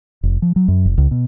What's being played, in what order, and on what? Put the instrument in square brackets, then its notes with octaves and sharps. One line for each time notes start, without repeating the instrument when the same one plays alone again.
[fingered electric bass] F1
F3
F#3
F#2
F1
C#2
B2